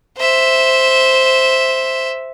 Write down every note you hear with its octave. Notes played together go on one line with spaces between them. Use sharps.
C5 E5